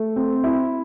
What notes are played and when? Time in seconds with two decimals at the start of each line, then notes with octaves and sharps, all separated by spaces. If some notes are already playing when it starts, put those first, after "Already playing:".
Already playing: A3
0.16 C4
0.44 E4